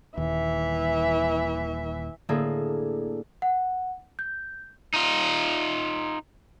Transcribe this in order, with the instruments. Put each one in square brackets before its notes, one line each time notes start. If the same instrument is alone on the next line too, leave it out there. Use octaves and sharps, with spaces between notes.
[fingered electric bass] D#1 D#2 [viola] E3 E5
[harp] A2 D3 A#3 G#4 A4
[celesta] F#5
G6
[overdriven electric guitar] D#4 F4